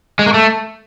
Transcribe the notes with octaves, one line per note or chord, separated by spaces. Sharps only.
G#3
A#3
A3